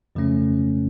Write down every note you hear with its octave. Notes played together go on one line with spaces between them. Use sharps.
F2 C#3 F3 A3 C#4